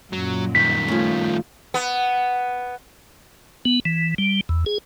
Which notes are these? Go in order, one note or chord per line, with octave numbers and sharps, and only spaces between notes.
F#2 A#2 F#3
G2 D#3 B6
F3 A3 C#4
B3
B3
E3
G3
E2
G#4